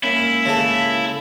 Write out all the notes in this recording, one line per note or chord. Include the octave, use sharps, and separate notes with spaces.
G#2 A#3 C#4 E4
C#3 A4